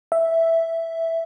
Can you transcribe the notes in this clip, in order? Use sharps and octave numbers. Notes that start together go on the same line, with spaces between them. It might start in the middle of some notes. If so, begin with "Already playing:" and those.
E5